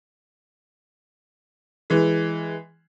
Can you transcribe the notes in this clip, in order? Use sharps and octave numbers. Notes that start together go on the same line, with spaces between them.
E3 G#3